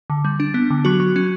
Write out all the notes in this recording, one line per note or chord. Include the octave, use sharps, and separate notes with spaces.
D3
G3
D4
B3
D3
F#3 F#4
F#3
C#4